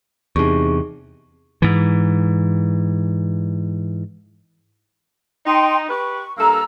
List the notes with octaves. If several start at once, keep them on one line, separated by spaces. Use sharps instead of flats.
E2 C3 D#4 G#4 C#6
G#2 E3
D#4 G5 C6
G4 B4 C#6
G2 A#3 A4 A#5 E6